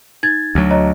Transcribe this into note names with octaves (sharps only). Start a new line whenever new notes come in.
D#4 G#6 A6
D2 F#3
C#5 D#5 A#5